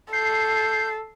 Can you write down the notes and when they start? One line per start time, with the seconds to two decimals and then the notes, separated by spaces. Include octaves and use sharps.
0.13 A4 G6 C7